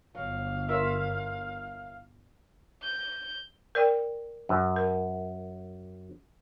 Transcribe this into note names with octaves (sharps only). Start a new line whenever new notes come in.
G1 F#3 F5
E4 F4 A#4 C#5 E5
G6
A#4 D5 G5
F#2
A#4